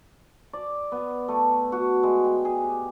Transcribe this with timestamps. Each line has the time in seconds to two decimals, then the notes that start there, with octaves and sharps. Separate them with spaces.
0.53 D5
0.92 B3
1.28 A3
1.72 F#4
2.03 G#3
2.24 G5
2.45 G#4
2.63 G4